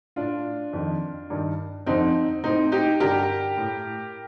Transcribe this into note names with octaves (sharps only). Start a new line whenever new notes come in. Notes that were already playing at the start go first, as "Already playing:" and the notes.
A2 D4 F4
F2 D#3
G2 D#3
F2 D3 C4 D#4
A2 C4 D#4
D#4 G4
G2 D3 G4 A#4
A2